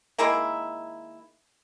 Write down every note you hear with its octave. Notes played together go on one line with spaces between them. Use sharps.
D#3 G#3 A#3 E4